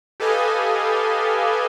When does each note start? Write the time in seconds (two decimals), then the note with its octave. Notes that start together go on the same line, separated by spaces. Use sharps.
0.20 G4 A4 B4 D#5 F5 G#5